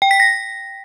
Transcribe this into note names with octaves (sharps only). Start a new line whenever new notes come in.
G5
B6
A#6